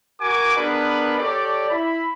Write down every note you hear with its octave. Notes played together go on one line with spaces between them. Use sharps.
F#4 A#4 F#5 G#5 D6
B3 D4 G#4 A#4 B4 D5
G4 A4 C#5 D5
E4 B5